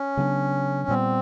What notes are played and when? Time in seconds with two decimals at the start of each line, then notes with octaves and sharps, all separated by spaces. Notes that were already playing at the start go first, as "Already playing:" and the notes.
Already playing: C#4
0.17 C#3 F#3 B3 D4
0.88 A#2 G3 B3 C4